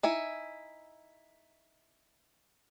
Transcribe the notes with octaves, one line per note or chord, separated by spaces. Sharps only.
D#4 E4 G#5